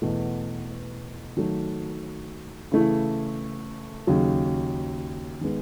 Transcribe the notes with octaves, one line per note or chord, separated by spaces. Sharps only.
E2 B2 A3
D#3 F#3 A3
C#3 E3 A3 E4
D#2 C#3 F#3
D#3 G#3 B3